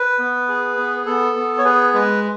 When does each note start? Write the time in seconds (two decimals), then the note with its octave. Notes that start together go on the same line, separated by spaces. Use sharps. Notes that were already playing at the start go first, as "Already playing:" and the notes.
Already playing: B4
0.19 B3
0.48 G#4
0.77 B3
1.06 B3 A4
1.36 B3
1.58 C#5
1.65 G#4 B4
1.94 G#3 B4